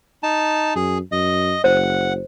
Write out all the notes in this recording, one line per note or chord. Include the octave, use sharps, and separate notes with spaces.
D#4 A5
F#2 G#4
F#2 D#5
F#1 C5 F#5